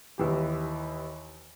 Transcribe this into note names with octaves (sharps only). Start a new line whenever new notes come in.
D#2 E3 G4